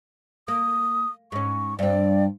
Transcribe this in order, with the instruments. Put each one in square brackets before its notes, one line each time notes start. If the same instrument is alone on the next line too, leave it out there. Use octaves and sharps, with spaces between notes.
[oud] A#3 [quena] D#6
[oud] G#2 C#4 [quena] C#6
[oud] G2 C4 [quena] D5